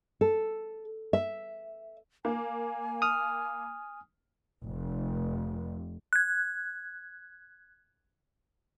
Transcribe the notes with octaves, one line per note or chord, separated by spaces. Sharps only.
A4
E5
A#3 G#5
D#6 F6
F1
F#6 G#6